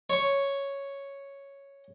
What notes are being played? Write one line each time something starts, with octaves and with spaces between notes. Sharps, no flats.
C#5 C#6